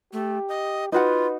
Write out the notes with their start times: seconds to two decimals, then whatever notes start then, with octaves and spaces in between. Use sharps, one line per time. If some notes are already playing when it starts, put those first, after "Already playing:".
0.13 A3 G4
0.49 D#5
0.92 D#4 F4 F#4 B4 F#5